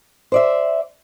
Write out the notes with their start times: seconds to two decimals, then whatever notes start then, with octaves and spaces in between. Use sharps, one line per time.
0.32 C5 D5 E5